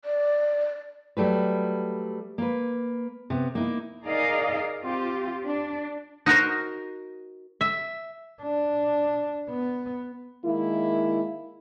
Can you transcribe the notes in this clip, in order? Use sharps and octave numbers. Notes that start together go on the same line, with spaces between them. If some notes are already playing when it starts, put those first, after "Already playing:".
D5
F#3 G3 A3 B4
A#3 B4
C3 B3
A#3 D#4 E4
D#4 G#4 A#4 D5 D#5 F5
C4 F4 G4
D4
D#4 F#4 A#4 C5
E5
D4
B3
D#3 G#3 A#3 E4